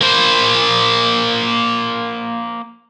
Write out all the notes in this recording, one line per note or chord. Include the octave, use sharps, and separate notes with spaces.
A#3 C5